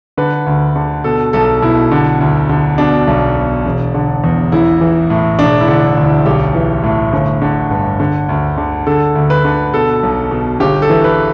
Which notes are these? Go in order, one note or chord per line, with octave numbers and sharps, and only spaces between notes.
D3 B4
D2
D3
B2 A4
B1 A4
B2 E4
D3
D2
D3
B2 D4
B1
B2
E1
D3
E2
A1 E4
E3
A2
E1 D4
E4
D3
D2
E4
B1 G4
E3
A2
G1
D3
G2
D3
D2
D3
D3 A4
D2
B4
D3
B2 A4
B1
B2
G1 G4
A4
E3
B4